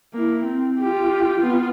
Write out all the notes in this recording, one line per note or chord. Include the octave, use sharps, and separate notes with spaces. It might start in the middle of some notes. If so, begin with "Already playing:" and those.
A#3 E4
C4
F4 G4
B3 F4